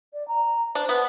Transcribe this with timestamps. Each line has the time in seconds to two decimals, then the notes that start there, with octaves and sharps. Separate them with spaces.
0.13 D5
0.28 A#5
0.75 D4 C5
0.89 B3